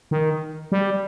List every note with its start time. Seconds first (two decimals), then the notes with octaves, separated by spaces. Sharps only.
0.11 D#3
0.72 G3